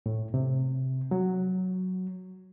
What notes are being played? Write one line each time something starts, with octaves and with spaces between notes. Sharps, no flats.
A2
C3
F#3